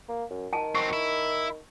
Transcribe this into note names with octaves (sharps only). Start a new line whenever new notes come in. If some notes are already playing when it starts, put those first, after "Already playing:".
A#3
F#2
D#3 G#5 A5
F#3 C4 C#6
E4